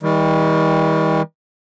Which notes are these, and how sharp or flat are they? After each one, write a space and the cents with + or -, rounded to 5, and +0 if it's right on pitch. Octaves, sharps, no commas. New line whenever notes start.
D#3 +45 G3 +25